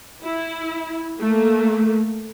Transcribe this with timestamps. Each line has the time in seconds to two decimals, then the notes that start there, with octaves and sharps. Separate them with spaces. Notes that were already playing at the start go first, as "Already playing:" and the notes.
0.23 E4
1.19 A3 A#3